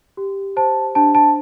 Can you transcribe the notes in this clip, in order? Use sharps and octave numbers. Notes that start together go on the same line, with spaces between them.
G4
C5 A5
D4 A5
A5